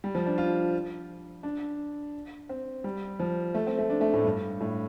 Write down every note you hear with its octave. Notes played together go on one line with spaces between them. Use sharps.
G3
F3
D4
F4
D4
C4
G3
F3
A3
C4
A3
D4
A3
A2
G2
A2